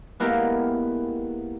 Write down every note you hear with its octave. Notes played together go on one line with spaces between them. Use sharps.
G#3 A#3 B3 E4 G4 A#4